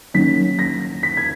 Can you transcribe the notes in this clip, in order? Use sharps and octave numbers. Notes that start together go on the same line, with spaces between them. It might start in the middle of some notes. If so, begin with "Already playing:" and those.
D#3 F#3 A#3 C#4 B6
A#6
B6
G#6